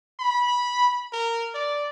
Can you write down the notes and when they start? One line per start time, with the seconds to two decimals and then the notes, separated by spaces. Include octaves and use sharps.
0.19 B5
1.12 A#4
1.54 D5